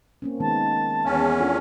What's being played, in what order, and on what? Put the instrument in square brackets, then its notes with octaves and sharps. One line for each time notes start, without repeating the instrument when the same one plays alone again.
[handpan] A#3 C4 C#4
[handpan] D#3 G#3 B3 [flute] A5
[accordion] E2 C#4 [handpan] F5
[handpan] D4 F4 A4